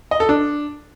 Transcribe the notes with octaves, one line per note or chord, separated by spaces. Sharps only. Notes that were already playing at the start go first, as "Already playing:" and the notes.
D#5
A4
D4